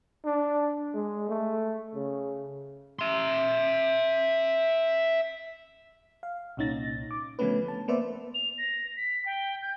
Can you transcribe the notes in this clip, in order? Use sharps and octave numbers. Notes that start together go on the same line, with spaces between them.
D4
G#3
A3
C#3
E5 C6
F5
C2 A#2 C#4 D#4 A6 A#6
D6
D3 F3 A3 B3 C#4 B4
A5
A#3 B3 B4 C5 D5 E5
F7
A#6
B6
G5
G6